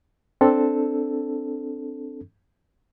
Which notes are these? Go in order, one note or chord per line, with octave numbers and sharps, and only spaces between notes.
C4 D4 A4